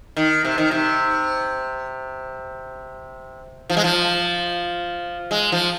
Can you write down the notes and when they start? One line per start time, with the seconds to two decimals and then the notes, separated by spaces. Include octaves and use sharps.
0.17 D#3
0.45 C3
0.58 D#3
0.71 C3
3.70 F3
3.77 G#3
3.84 F3
5.31 G#3
5.52 F3